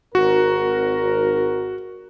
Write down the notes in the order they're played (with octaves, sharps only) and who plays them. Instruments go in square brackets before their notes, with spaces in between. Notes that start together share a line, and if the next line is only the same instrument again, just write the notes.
[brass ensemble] G#1 A#4 [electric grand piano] F#4